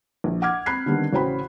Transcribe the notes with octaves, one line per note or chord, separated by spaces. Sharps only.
A#1
F#5 D6 F6 G#6
C4 B5 F#6 C7
D3 D#3 G3 B3 C4
A1 C#3 F#4 C5 G5 B5